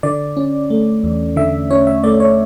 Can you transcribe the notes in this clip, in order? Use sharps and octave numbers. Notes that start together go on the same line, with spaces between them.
D3 D5
C#4
A3
E2
D3 E5
C#4 C#5
E5
A3 D5
C#5